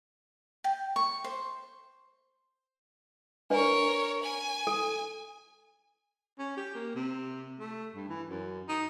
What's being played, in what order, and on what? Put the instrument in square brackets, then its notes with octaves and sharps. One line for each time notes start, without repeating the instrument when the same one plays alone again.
[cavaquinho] G5
C#6
C5
[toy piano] D4 B4 D5 [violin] A#4 C#5
[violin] G#5
[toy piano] A4
[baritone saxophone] C#4
G4
A#3
C3
A3
G2
E3
F#2
D#4